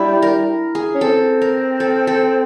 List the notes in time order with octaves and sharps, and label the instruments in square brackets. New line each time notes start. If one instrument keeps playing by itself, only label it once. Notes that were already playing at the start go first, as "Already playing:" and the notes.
Already playing: [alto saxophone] G3 [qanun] D4 E4
[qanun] A#4
G#4
[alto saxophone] C#4
[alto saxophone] C4 [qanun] A4
[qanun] A#4
A4
A4